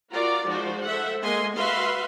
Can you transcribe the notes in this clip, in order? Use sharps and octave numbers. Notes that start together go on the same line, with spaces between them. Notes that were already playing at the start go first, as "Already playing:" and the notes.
F4 F#4 A#4 D5 A#5
F3 G#3 D#4 F#4 C5
A4 C5 E5 F#5
G#3 A#3 D#5 G#5 C6
F#4 B4 E5 F5 C6